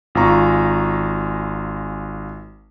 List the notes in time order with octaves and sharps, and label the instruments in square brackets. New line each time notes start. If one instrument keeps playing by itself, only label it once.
[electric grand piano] G#1 F4 G#5 A#5 C#6